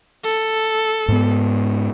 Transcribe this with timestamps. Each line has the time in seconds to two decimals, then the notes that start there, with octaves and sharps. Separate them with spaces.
0.24 A4
1.08 G#2 B3